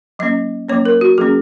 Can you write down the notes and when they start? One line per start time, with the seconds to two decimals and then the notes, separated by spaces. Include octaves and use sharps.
0.19 F#3 A#3 C#4 D#5
0.69 F#3 A#3 C#4 C#5
0.85 A#4
1.01 F#4
1.18 F#3 A#3 C#4 G#4